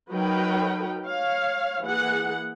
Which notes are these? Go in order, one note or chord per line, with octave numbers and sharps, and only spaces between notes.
F#3 D#4 A#4 B4 G5
C#5 F5
E3 A#3 G#4 F#5